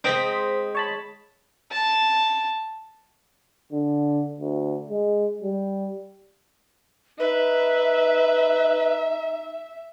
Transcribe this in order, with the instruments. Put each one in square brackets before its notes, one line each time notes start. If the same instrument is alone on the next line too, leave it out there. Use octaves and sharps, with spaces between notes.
[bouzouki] G#3 D#4 D#5 [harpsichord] C4 [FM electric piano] C5 A#6 B6
[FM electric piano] C#5 A5 B5
[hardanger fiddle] A5
[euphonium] D3
D2
G#3
G3
[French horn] D#4 [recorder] B4 [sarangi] E5